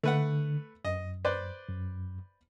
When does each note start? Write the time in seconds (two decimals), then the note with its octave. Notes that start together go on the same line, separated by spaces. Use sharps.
0.03 D3 A3 B4 F#5
0.85 F#2 D#5
1.25 B4 C5 D5
1.68 F#2